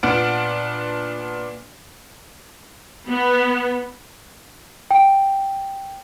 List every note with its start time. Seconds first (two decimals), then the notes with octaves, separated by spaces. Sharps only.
0.03 A#2 B3 D4 F#5 F6 D7
3.09 B3
4.91 G5